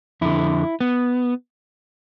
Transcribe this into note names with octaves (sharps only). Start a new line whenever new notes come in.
F2 D3 E4
B3